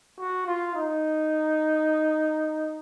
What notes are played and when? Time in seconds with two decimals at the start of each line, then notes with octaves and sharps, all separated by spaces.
0.19 F#4
0.47 F4
0.75 D#4